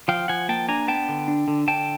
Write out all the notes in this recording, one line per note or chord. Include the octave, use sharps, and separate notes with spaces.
F3 F5 G5
F3 F#5 G#5
A#3 G5 A5
D4 G#5 A#5
B3 G5 A5
D3
D4
D3
D3 G5 A5